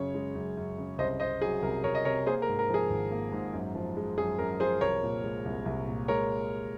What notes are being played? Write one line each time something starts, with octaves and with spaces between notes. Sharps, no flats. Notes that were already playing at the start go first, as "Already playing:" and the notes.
Already playing: F#2 C#3 C#5
G#3
F#2
F#2
C#3
C2 C5 D#5
C3 C5 D#5
F#3 G#4
C2 A#4
C2 A#4 C#5
D#5
C3 A#4 C#5
A#3 G#4 C5
A#4
G#2
A#4
F3 G#4
G#1
A#3
G#2
F#2
F3
G#3
F#2 G#4
F#2 A#4
F3 G#4 C5
C2 A#4 C#5
A#2
G#3
C2
C2
A#2
G#3 A#4 C#5